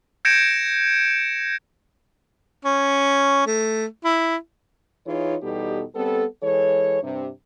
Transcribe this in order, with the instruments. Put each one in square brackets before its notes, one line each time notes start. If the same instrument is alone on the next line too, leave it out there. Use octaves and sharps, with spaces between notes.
[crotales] G6 G#6 A#6 C#7 D7 E7
[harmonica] C#4
A3
E4
[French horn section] E3 D#4 F4 G#4 C#5
E2 B2 G3 D#4 G4 A4
G3 B3 C4 A4
E3 G#3 A4 C#5
G2 C3